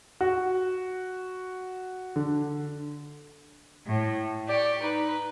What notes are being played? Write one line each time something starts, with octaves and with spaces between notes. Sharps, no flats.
F#4
D3
A2
G4 D5 C#6
D#4 B4